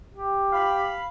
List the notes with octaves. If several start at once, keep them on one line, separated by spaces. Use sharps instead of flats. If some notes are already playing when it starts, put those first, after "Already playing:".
G4
F5 B5